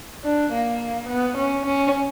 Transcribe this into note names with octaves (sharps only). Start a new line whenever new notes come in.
D4
A#3
B3
C#4
C#4